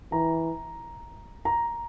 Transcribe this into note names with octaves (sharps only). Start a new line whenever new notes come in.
E3 A#5
A#5